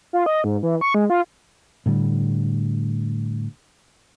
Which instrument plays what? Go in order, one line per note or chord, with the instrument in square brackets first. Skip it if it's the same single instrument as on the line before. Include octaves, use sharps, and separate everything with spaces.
[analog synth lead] F4
D#5
G#2
E3
C#6
G#3
F4
[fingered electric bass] A2 D3 G3